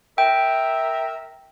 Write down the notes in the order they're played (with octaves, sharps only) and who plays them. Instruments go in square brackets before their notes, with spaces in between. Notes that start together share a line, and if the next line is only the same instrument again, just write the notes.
[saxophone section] A#4 E5 [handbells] G5